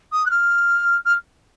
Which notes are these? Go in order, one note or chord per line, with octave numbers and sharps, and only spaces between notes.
D#6
F#6
F6
F6